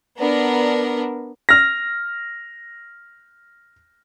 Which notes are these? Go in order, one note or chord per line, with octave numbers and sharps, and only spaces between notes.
B3 D4 A#4
F6 A#6